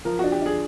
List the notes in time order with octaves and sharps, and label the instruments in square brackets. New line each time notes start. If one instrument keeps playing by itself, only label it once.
[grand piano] F3 [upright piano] A#4
[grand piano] D4 [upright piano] F#4
[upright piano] G4
[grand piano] D4 [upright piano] G#4